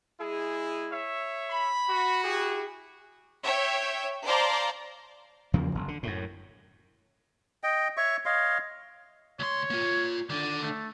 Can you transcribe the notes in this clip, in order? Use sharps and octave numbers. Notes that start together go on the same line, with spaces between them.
G#3 E4 G#4
C#5 E5
B5
F#4
E4 G4 G#4
C#5 E5 G5
C5 D5 F5 A5 A#5 C6
E2 C#3 F3 A#3
F#1
D3
F#2 A2
D#5 G5
C#5 E5 C#6
C#5 D#5 F5 C6
D2 C#5 C6
A#3 F4
D3 D#3 D5
A3